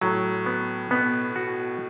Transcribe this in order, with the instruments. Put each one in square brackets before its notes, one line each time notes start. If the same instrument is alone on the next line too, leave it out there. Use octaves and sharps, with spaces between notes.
[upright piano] A2 [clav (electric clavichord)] F#3
[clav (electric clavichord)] B3
[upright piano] B2 [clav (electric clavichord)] B3
[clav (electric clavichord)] F#4